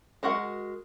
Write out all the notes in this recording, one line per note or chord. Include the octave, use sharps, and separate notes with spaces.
G#3 F#4 A#4 F#5